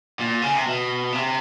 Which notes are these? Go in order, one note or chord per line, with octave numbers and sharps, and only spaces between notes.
A#2
C#3
C3
B2
C3